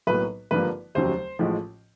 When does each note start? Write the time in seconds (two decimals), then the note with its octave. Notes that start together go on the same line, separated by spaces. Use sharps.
0.07 B1 A2 F#3 A#3 B4
0.51 G#1 G2 D3 F3 A#3 B4
0.95 F1 D#2 C#3 F#3 C5
1.39 A1 A2 F3 G#3